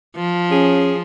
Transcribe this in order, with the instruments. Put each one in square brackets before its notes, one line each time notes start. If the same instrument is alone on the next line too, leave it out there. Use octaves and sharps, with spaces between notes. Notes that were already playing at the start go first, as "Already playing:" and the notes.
[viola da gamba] F3
[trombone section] C#4 [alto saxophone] G#4